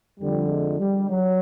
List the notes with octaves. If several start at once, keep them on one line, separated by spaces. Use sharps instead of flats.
F2 D3 F3 G3
G#3
G3
F#3